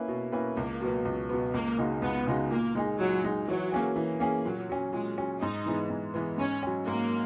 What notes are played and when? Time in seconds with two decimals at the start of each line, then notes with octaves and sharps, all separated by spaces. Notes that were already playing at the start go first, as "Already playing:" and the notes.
Already playing: A#3 C#4 E4 B4
0.08 B2
0.32 A#3 C#4 E4 B4
0.57 C#2 A#3
0.81 B2 F#3 B3
1.05 C#2
1.29 B2 F#3 B3
1.54 C#2 A#3
1.78 C#3 G#3 D#4 F#4
2.02 C#2 B3
2.26 C#3 G#3 D#4 F#4
2.51 A#2 A#3
2.75 G#3 D#4 G#4
2.99 A#2 F#3
3.24 G#3 D#4 G#4
3.47 E3 F#3
3.72 A#3 C#4 G#4
3.96 E3
4.20 A#3 C#4 G#4
4.45 A#2 F#3
4.69 F#3 C#4
4.93 A#2 G#3
5.18 F#3 C#4
5.41 G#2 D#4
5.66 E3 G#3 B3
5.90 G#2
6.14 E3 G#3 B3
6.38 G#2 C#4
6.63 F#3 C#4
6.87 G#2 A#3